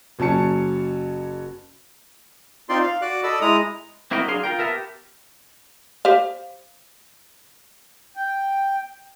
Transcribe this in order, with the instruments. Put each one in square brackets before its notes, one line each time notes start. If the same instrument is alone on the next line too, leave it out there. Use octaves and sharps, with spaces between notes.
[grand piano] F#1 F#3 C#4 A5 C#7
[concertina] C4 D#4 F4 D5 C6
F5
F#4 D5 D6 F#6
A4 D5 D#5 B5 E6
G#3 E4 A#5 D#6
[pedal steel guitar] C4 E4 F#4 A#4 D#5
F#3 D4 G#4 F5 C6
F4 A#4 G5
B3 A#4 E5 A5
G4
[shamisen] G4 C5 F5
[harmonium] G5